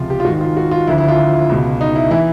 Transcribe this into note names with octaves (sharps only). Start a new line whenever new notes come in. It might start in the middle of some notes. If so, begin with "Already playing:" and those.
Already playing: C#2 C3 F3 F4
G4
F4
G#2 D#3 F#4
F4
F#4
F4
D2 D3 F3 E4
E4
F4
C#2 B2
D#4
E4
E3 E4